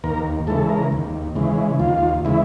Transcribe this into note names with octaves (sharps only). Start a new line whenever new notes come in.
D#2 A#4
C#3 E3 G#3 A4
A#4
D#2
C#3 E3 G#3
D#2 F4
C#3 E3 G#3 E4